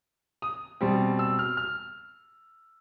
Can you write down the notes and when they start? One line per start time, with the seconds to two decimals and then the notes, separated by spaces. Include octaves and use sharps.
0.42 D#6
0.81 B2 G3 C4
1.19 E6
1.39 F6
1.57 F6